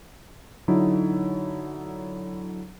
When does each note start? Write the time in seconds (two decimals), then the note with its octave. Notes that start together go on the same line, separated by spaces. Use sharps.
0.68 D3 F#3 D#4 E4